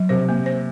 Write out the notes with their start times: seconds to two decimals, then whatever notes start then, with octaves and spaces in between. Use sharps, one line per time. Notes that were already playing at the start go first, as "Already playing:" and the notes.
Already playing: F#3
0.09 C3 C5
0.29 A#3
0.46 C5